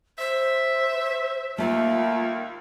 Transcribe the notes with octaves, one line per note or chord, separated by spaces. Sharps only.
C5 E5
D#2 A3 A#3 F4